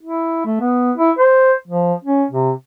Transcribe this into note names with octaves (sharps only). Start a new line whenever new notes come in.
E4
A3
B3
E4
C5
F3
C#4
C3